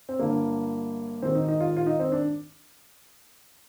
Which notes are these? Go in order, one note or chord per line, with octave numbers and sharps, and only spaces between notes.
C4
G1 G2 D3 A#3
G#1 G#2 D#3 C4
D#4
D#4
F4
F4
D#4
C4
D4